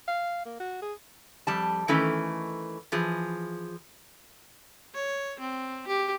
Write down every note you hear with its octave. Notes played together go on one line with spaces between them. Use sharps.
F5
A#3
F#4
G#4
F2 G3 A5
D#3 E3 A3 C#4
E3 F3 G#4
C#5
C4
G4